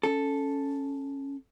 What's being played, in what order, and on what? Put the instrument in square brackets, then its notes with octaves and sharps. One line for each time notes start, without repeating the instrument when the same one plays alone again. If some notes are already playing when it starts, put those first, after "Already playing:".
[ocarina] C#4 [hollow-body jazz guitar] A4